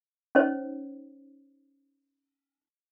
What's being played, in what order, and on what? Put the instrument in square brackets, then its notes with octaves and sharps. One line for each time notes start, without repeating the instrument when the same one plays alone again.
[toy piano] C#4 D#4 C5 C#5